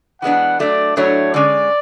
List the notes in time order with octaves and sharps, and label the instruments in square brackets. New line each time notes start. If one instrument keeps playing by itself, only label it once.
[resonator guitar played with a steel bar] E3 G#3 B3 D4 [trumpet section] F#5
[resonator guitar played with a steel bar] F#3 A3 D4 [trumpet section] D5
[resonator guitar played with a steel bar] A2 F#3 A3 D4 [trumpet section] C#5
[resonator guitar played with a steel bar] D3 G#3 C#4 [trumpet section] D5